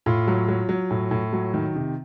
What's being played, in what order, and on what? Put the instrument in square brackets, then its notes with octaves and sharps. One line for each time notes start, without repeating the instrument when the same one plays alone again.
[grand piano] A2 F4
F#3
F#3
F#3
A2
A2
F#3
D#3
C3